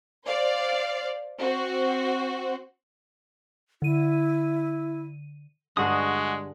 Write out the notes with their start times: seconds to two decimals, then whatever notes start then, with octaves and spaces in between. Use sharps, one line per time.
0.25 C5 D5 F5
1.40 C4 F#4 C5
3.82 D3 E4 D#7
5.77 G2 D3 G#3 F#4 G#4 D#6